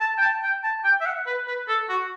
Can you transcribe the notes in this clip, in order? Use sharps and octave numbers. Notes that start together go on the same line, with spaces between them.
A5
G5
A5
G5
A5
G5
E5
F#5
B4
B4
A4
F#4